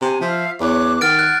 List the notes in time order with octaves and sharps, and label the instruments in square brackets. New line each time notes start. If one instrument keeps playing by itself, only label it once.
[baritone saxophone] C3 [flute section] G#5 A5
[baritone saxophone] F3 [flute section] F4 E5 F5
[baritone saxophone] E2 [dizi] C#5 [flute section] D6 F#6
[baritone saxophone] D#3 [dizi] F#5 [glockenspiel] F6 A6 D7
[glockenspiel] F#6 [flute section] G#6